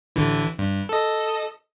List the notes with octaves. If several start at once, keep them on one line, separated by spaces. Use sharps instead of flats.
A1 D3 E3
G2
A4 D#5